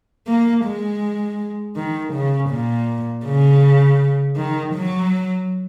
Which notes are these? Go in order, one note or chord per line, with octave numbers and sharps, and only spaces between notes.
A#3
G#3
D#3
C#3
A#2
C#3
D#3
F#3